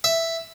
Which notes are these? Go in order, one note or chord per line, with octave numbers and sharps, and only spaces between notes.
E5